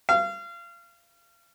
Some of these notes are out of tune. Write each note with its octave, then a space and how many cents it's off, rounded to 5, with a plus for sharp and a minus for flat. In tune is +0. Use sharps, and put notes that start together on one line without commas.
F5 -30